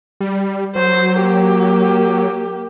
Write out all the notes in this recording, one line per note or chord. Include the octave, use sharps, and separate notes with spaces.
G3
F#3 C5
A#3 G4